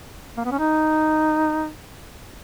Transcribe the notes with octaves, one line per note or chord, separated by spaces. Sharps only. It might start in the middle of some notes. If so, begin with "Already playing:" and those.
A#3
B3
C#4
D#4